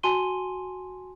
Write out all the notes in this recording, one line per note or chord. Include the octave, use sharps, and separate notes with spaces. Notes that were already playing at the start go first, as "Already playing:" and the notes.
F#4 G#5 A5 C6 D#7 G7